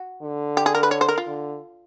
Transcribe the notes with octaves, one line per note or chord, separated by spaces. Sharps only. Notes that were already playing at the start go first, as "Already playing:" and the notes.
Already playing: F#4
D3
G4
G#4
A#4
B4
C#5
C5
A#4
F4
D3